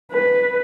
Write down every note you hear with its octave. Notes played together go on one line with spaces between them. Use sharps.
B4